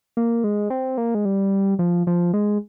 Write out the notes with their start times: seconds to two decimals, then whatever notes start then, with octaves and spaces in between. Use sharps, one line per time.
0.17 A#3
0.44 G#3
0.70 C4
0.98 A#3
1.15 G#3
1.25 G3
1.79 F3
2.07 F3
2.34 G#3